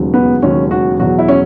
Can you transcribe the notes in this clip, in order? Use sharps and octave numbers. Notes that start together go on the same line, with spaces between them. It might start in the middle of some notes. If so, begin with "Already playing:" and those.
Already playing: E1 D#2 C#3 F#3
B3
E1 D#2 C#3 F#3 C#4
F#4
E2 B2 F#3 F#4
E4
C#4